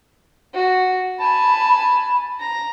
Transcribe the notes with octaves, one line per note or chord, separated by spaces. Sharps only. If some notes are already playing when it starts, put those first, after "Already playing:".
F#4
G#5 A5 B5
A#5